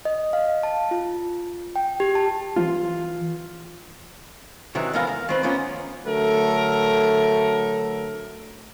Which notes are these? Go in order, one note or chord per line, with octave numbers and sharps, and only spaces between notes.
D#5
F5
A5
F4
G5
G4
A5
E3 F4
C3 D#3 E3 F#3
E2 G#2 B3 A#4 F5
A#4
D#3 C4 B4
D#3 F3 A#3 B3 C#4 F4
D3 F#3 A3 A4 A#4